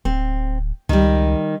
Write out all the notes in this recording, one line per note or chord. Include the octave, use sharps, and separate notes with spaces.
D1 C4
C#2 D#3 G3